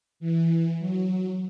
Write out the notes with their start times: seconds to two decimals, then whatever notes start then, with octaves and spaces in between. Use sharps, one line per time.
0.20 E3
0.79 F#3